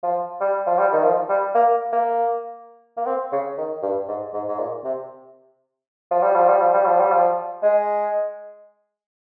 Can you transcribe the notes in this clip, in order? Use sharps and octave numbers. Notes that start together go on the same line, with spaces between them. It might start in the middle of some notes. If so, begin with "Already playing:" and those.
F3
G3
F3
G3
D#3
F3
G3
A#3
A#3
A#3
C4
C#3
D#3
G2
G#2
G#2
G#2
A#2
C3
F3
G3
F3
G3
F3
G3
F3
G3
F3
G#3